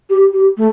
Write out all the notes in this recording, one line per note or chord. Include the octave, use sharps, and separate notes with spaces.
G4
G4
A3